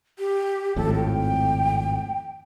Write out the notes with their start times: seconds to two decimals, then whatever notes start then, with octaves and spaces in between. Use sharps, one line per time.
0.19 G4
0.76 G#1 F2 A2 A4
0.95 G5